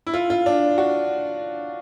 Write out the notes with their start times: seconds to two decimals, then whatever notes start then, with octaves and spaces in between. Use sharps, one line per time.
0.07 E4
0.14 F4
0.30 F4
0.46 D4
0.78 F#4